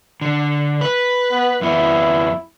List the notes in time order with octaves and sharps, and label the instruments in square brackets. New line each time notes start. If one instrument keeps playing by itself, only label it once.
[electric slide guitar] D3
B4
[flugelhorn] B3
[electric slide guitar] F2 B3 [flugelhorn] E4